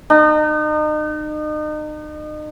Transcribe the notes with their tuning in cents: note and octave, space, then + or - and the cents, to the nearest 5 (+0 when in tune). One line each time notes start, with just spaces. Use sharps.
D#4 -35